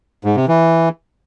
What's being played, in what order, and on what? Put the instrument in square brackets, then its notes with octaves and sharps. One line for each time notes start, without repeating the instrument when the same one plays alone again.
[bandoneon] G#2
C3
E3